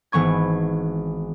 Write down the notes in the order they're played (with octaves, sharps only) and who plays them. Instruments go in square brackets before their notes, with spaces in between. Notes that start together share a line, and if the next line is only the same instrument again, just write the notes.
[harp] G#1 E3 B3 C#6 G#6